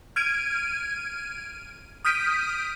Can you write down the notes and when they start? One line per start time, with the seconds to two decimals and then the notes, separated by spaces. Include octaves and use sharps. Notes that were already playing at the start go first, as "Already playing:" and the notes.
0.16 F6 G#6 D7 D#7
2.05 D#6 F6 G6 B6 D7 D#7